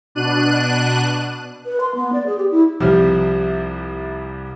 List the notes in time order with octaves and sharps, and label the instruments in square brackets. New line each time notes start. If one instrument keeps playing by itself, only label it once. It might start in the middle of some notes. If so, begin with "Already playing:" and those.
[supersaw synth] B2 D4 F#6 D#7
[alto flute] B4
C6
B3
D5
G#4
G4
E4
[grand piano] C2 C3 F3 G3